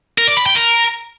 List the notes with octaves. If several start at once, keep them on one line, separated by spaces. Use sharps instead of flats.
A#4
D5
B5
G5
A#4